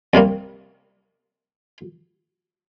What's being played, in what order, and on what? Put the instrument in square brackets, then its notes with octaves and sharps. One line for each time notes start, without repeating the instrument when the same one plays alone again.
[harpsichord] C2 C3 G3 A#3